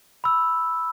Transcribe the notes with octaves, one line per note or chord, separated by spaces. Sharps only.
B5 E6